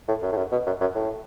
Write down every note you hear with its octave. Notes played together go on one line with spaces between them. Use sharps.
A2
F#2
A2
F#2
B2
F#2
F#2
A2